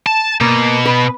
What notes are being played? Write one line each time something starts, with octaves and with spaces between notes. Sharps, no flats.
A5
B2 A#3
B4